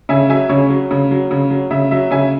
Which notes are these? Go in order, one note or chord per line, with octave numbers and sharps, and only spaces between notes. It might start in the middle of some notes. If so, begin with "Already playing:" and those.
C#3 E5 G#5
F#3 E5 G#5
C#3 C#5
F#3
C#3
F#3
C#3
F#3
C#3 E5
F#3 E5
C#3 E5 G#5